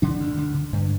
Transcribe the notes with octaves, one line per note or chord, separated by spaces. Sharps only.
D3 D4
D2
D3
D3
G2